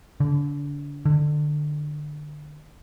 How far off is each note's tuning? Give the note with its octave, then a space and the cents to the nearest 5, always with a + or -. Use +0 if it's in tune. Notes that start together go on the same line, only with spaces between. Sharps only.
D3 -35
D3 +25